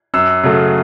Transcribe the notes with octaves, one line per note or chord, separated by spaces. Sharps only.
F#2 E6
C#3 F#3 A3